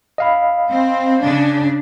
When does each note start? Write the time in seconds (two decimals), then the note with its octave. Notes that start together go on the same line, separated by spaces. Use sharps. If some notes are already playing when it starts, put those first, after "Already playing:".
0.18 D#5 F5 B5
0.70 C4
1.24 C#3 D4